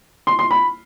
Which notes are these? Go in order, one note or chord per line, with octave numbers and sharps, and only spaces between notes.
C6
C6
B5